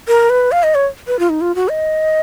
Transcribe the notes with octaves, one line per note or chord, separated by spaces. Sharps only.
A#4
B4
F5
D#5
C#5
B4
F4
D#4
F4
F#4
D#5